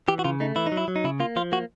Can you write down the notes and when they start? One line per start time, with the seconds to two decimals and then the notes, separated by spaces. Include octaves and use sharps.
0.08 E3 G4
0.19 F#4
0.24 C#3 F4
0.40 A3 D#4
0.56 E3 E4
0.66 D#4
0.72 F#3
0.77 E4
0.88 F#3
0.96 D#4
1.04 C#3 E4
1.20 A#3 F4
1.36 F3 F4
1.52 A#3 F#4